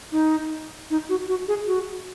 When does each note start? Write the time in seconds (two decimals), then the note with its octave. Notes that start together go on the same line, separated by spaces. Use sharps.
0.12 D#4
0.90 D#4
1.09 F#4
1.29 F#4
1.48 G#4
1.68 F#4